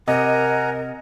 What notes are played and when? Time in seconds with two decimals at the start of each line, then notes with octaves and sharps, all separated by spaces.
0.08 C3 A#4 D#5 F#5 G#5 A#5